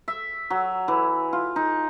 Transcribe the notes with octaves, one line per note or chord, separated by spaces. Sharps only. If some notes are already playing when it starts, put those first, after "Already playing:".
E5
F#3
E3
F4
D#4